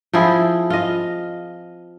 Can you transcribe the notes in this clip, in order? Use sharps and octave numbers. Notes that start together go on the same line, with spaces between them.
F3 C4 E4 G#4
F4 D#5